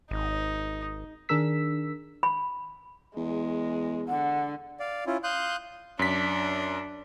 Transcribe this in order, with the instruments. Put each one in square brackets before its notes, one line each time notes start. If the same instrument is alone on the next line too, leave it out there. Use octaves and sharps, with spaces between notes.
[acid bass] G#1 [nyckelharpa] D#4
[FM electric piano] D#3 D4 G#4 A#4 E6 B6
[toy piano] B5
[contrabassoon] E2 [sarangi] G#3
[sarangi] D3 [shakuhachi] F#5
[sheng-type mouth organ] D5 F5
C#4 E4 F4
F5 C6 D#6 F#6 G6
[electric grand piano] F#2 B6 [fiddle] D4